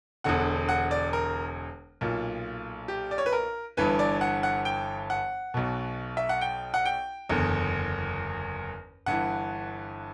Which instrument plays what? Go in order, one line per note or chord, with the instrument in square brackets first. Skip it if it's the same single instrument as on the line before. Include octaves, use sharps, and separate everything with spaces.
[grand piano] E1 E2 D3 F#5
F#5
D5
A#4
B1 A#2
G4
D5
C#5
B4
A#4
G1 G2 E3 B4
D5
F#5
F#5
G5
F#5
B1 B2
E5
F#5
G5
F#5
G5
F#1 E2 D3
G1 G2 E3 F#5